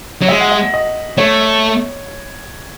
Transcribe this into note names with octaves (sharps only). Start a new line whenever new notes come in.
F#3
G#3 E5
F#5
E5
D#5
A3 C#5